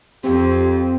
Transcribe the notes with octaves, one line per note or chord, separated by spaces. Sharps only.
F2 C4 G4